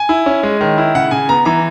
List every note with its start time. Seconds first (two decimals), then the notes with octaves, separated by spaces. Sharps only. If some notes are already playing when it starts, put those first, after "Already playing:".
Already playing: G#5
0.09 E4
0.26 C#4
0.43 G#3
0.61 D#3
0.78 E4
0.95 C#3 F#5
1.11 C#3 G#5
1.29 B3 A#5
1.45 E3 A#5